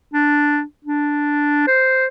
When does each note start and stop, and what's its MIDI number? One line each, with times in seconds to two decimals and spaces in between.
0.13 0.62 62
0.85 1.66 62
1.68 2.06 72